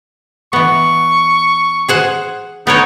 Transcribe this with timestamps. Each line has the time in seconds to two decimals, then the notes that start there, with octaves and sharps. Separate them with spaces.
0.53 E3 B3 C#6
1.88 G#4 C5 F#5
2.67 B3 D#4 A#4 C#5